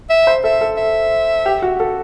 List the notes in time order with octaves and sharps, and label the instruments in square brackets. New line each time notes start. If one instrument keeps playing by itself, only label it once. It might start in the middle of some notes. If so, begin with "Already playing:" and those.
[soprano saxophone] E5
[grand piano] C5
[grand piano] A4 [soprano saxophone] E5
[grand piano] A4
[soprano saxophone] E5
[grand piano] G4
F#4
A4